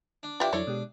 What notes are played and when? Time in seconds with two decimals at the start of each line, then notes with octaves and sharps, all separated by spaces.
0.23 D4
0.40 D4 E4 F4 G4 B4 E5 F5
0.53 F2 F#3 D4 E4 A4 C#5
0.67 B2 G#3 G4